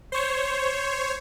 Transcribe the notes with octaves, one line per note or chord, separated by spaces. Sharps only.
C5 C#5